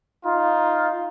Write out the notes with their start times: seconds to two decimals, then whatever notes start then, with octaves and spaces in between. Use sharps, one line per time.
0.25 D#4 F4